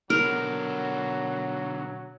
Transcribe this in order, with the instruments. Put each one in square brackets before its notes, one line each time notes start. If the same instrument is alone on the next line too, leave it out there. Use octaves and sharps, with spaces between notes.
[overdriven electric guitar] B2 D3 [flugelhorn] F#3 [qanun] A#4